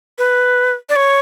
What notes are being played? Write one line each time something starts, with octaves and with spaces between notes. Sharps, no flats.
B4
D5
C#5